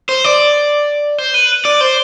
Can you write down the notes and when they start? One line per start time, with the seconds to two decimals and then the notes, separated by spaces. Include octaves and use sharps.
0.09 C5
0.24 D5
1.18 C5
1.34 B4
1.65 D5
1.81 C5